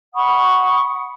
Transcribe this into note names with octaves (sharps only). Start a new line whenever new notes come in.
F#5 B5 C#6 D#6